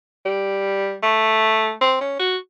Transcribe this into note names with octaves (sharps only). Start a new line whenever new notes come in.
G3
A3
C4
C#4
F#4